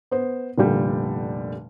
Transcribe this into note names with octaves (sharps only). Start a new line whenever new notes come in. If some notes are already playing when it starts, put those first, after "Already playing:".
B3 C5
F1 A#2 D3 G3 G5